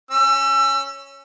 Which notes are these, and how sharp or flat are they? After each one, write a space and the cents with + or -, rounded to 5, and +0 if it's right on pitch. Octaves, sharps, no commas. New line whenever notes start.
C#4 +0 E6 +30